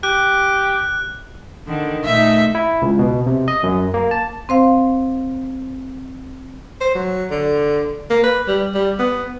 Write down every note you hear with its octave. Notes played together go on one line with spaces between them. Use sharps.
G4 F#6
D3 D#3
A#2 A3 D#4 E5
E4
C#2
B2
C3
D#5
F#2
A#3
A5
C4 C5 F5
C5
F#3
D3
A#3
B4
G3
G3
B3